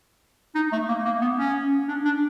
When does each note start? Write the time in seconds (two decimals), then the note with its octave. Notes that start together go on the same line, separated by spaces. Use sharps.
0.55 D#4
0.72 A3
0.88 A#3
1.05 A#3
1.22 B3
1.38 C#4
1.88 D4
2.05 D4